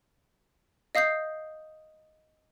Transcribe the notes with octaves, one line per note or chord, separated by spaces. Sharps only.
D#5 F5 D#6 G6 C7